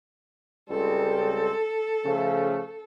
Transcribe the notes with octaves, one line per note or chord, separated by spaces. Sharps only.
C#2 G3 C4 A4
C#3 F3 A3